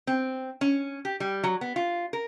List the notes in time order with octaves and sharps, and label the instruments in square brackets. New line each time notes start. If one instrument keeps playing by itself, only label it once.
[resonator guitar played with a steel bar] C4
C#4
G4
G3
F#3
B3
F4
A#4